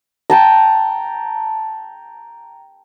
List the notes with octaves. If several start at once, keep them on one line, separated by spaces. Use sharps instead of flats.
G5 A5 A#5